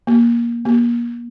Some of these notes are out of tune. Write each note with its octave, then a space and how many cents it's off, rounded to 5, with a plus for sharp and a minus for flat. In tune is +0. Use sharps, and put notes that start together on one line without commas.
A#3 +15
A#3 +30